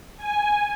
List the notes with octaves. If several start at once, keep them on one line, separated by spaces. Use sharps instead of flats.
G#5